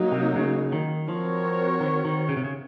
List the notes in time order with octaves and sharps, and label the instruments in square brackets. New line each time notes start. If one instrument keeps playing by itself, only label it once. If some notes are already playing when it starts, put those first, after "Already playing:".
Already playing: [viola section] F#3 A#3 D#4
[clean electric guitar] C3
C#3
D#3
[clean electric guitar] F3 [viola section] C4 F#4 A#4 C#5
[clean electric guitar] D#3
D#3
C#3
C3
C#3